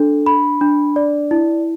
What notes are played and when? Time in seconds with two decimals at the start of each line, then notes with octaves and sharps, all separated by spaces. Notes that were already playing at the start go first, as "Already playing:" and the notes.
Already playing: D4 A4
0.26 B5
0.61 D4
0.96 D5
1.31 E4